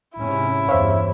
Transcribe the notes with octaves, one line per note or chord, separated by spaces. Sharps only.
G#2 C3 C#4 E4
E2 G2 C5 C#5 E5 F5